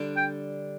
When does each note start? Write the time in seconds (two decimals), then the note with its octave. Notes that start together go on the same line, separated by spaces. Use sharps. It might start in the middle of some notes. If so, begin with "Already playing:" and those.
Already playing: D3 G3 D4
0.16 G5